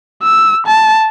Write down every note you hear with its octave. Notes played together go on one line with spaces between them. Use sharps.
E6
A5